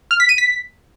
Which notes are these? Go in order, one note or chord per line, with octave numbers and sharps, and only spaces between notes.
F6
B6
D#7
B6